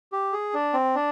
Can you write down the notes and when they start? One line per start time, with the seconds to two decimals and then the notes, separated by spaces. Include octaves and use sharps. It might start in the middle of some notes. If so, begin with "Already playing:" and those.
0.12 G4
0.33 G#4
0.54 D4
0.74 C4
0.95 D4